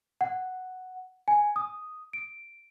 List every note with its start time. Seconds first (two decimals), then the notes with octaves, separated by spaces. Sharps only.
0.21 F#5
1.28 G#5
1.56 D#6
2.13 D7